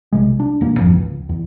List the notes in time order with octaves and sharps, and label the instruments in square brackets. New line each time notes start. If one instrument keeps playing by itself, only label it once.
[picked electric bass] B1 C3 G#3
D4
E1 A#3
G#1 F2 F3
C#2
E2